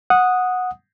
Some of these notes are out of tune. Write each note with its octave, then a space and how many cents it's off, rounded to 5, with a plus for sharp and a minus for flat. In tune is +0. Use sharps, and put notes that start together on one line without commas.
F#5 -10 D#6 +0